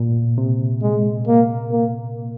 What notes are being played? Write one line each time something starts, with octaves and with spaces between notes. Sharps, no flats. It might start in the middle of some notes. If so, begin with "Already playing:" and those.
Already playing: A#2
C3
G#3
A#3
A#3